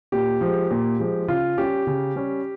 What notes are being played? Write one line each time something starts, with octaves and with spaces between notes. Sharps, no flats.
A#2 G4
F3 G#3
A#2
F3 G#3
C#3 F4
G3 C#4 G4
C#3
G3 C#4